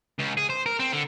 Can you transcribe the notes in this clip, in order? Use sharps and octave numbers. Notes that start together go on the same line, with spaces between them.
C#2
G#4
C5
A#4
C4
D3